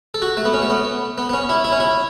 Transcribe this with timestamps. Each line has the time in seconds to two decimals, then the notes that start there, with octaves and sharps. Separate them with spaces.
0.14 A4
0.22 F#4
0.37 A3
0.45 B3
0.54 C#4
0.62 A3
0.70 B3
1.18 B3
1.29 B3
1.34 C#4
1.49 E4
1.64 E4
1.72 C#4
1.80 E4